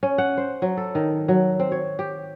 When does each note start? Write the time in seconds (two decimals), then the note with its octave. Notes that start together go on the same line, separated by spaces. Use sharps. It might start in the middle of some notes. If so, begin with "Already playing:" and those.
0.03 C#4
0.18 F#5
0.37 C5
0.62 F#3
0.77 A4
0.95 D#3
1.28 F#3
1.59 C4
1.72 C#5
1.99 G4